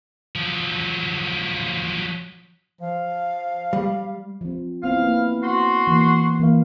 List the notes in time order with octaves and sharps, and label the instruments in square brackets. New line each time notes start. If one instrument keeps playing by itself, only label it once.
[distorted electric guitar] F3 F#3
[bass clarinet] F3 [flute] F5
[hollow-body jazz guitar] G3
[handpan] F3 C4
[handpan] B3 C4 E4 [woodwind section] F5
[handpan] A#3 E4
[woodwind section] F#4 C6
[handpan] E3 A#3
E3 A#3 F5